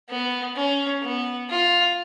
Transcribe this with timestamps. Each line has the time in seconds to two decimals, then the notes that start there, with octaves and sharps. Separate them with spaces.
0.10 B3
0.56 C#4
1.03 B3
1.49 F4